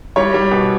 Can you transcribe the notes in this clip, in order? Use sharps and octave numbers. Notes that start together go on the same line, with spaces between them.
G3 C#5
G3
B2